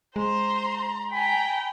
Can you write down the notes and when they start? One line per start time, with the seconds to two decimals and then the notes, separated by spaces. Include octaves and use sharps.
0.16 G#3 C5 A#5 C6
1.12 G5 G#5 A#5 B5